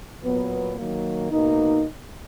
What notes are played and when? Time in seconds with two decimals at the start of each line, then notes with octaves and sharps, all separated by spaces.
0.23 A#2 F#3 B3
0.76 D#3 F#3 A#3
1.31 B2 A#3 D#4